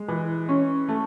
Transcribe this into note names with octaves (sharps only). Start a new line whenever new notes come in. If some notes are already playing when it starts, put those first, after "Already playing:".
Already playing: G#3
E3
C#4
A3